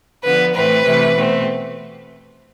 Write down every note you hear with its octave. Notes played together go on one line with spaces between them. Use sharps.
D3 F3 B3 B4
A2 E3 A3 C4 B4
C3 E3 A3
B2 A3 C4